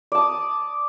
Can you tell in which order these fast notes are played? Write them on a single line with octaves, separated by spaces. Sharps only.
D5 A5 D#6